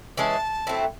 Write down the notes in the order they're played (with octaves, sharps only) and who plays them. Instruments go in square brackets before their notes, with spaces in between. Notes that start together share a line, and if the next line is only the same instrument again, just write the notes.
[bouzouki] E3 G#3 C#4 [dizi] A5
[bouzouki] F#3 A3 C4 E4